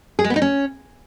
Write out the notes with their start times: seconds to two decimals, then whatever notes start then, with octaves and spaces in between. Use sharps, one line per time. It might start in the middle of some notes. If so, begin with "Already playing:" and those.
0.19 G#4
0.24 G#3
0.30 B3
0.36 D#4
0.42 C#4